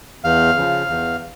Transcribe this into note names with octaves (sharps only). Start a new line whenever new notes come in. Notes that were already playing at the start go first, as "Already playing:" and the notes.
E2 F5
C#3 F3
E2